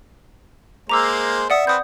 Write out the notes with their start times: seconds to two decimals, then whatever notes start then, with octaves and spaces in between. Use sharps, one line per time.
0.89 G#3 A#3 C5 A#5 D6 E6
1.50 D5 E5 F#5 D#6
1.67 C4 B4 D#6 G6